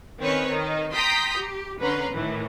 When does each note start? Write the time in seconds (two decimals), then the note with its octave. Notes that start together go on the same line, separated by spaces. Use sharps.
0.19 D#3 C4 C#4 B4 C#5
0.50 D#3 D#4
0.93 G5 A#5 C6 D#6 G6 B6
1.37 G4
1.79 D3 C#4 B4 A#5 C6
2.12 A2 D#3 E3